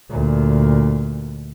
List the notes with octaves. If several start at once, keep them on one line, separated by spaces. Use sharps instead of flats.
D2 A#2